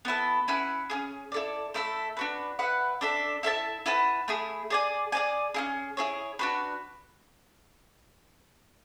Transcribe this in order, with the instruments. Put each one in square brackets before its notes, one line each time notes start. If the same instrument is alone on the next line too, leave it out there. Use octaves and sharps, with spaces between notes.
[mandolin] B3 E4 A4
C#4 E4 B4 F#5
C#4 E4 G#4
E4 A4 D5
A3 E4 A4 E5
D4 F#4 B4
E4 B4 F#5
D4 A4 E5
E4 A4 E5 A5
E4 B4 F#5 A5
A3 E4 G#4
G#4 D5 G#5
G#4 D5 G#5
C#4 E4 G#4
E4 G#4 C#5
D4 F#4 B4